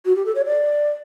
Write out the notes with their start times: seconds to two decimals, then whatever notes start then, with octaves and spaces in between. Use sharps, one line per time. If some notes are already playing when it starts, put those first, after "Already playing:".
0.06 F#4
0.15 G4
0.25 A4
0.35 C#5
0.45 D5